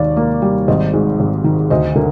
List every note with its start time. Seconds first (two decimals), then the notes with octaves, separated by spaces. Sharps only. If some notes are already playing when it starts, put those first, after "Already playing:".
Already playing: D#2 D#3 D5 F5
0.17 A#3
0.42 G3
0.68 G#1 C5 D#5
0.93 G#2
1.20 G#1
1.44 D#3
1.70 D2 C5 D#5
1.96 D3 A#4